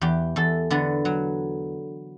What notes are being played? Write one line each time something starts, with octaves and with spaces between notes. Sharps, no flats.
E2 G4
E2 A4
D3 B3
F#3